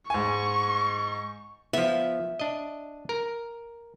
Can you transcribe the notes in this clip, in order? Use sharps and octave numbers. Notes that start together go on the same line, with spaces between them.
G#2 G#5 C#6
F3 B3 E5
D4 D#5
A#4